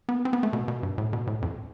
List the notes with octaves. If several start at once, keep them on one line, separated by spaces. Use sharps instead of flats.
B3
C4
B3
A3
B2
B2
G2
A2
B2
A2
F2